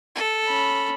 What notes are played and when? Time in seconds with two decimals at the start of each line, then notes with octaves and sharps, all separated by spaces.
0.15 A4
0.48 C#4 B5